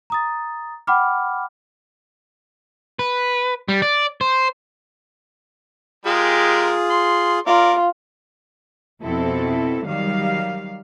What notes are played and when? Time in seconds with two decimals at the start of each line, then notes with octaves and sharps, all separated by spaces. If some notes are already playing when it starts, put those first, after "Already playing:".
0.10 A#5 D#6 A6
0.87 F#5 G5 B5 D6 F6
2.99 B4
3.69 G3
3.82 D5
4.21 C5
6.05 G#3 F4 G4 G#4 A#4
6.90 C6
7.47 F4 A#4 D5
9.02 F2 B2 C4 E4 A4
9.85 D#3 F#3 G3 F5